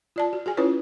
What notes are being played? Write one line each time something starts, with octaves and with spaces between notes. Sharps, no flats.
F4 D5 A5
F#4
F#4 G#4 G#5
C#4 E4 F4 B4 C#5